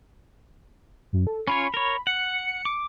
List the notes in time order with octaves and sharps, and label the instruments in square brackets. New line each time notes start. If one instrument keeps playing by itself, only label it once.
[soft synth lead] F#2
A4
[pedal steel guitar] C#4 F4 C#5 [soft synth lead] B5
[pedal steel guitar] A#4 C#5
[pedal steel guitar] F#5 [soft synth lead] C#7
[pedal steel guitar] D6